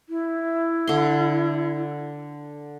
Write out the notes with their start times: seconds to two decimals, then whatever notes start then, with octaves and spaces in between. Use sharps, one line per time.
0.09 E4
0.87 D3 C6